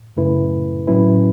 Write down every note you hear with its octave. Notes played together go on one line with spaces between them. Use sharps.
F#2 C#3 A3 E4 B4
A2 F#3 C#4 E4 B4